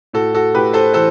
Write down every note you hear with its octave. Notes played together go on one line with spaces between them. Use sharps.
A2 F#4 A4
F#4 A4
A2 G4 B4
A4 C5
E3 A4 C5